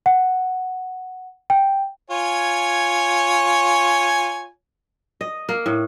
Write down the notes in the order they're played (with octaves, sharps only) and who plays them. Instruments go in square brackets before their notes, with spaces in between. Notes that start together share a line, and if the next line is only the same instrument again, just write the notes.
[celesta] F#5
G5
[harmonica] F4 C#5 G#5
[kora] D#5
A#3
A2